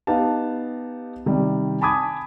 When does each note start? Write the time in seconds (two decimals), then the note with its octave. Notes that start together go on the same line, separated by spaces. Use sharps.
0.07 B3 D#4 G4 F5 A5
1.26 C3 D#3 G3
1.81 G#5 A5 B5 D6 D#6 G#6